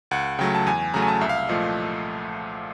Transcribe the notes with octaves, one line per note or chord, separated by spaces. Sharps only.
C#2 F#5
C#3 F#3 A3 G5
A5
E2 G#5
C#3 F#3 A3 A#5
G#5
A5
C2 E5
F5
E5
A#2 F3 A3 D#5